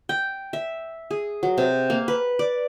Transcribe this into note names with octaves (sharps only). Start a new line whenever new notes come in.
G5
E5
G#4
F#3
C3
A#3
B4
D5